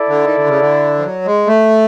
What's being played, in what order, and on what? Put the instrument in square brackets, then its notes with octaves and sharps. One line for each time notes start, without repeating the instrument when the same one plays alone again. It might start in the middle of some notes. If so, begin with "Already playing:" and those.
Already playing: [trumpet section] E4 A4 D5
[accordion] D3
D#3
D3
C#3
D3
F3
F#3
G#3
A3